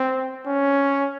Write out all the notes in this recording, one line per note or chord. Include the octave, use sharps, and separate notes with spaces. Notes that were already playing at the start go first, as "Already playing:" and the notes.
Already playing: C4
C#4